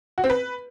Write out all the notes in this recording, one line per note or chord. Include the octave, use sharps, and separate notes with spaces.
F#4
C4
B4